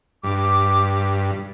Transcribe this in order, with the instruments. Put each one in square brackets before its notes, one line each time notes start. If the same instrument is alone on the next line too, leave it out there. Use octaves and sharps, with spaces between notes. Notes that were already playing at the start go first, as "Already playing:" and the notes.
[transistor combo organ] G2 [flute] D6